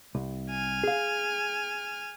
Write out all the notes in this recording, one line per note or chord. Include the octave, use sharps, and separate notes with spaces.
C2
G#5 F6
G#4 F5